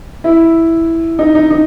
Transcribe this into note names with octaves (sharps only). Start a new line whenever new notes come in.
E4
D#4
D#4
D#4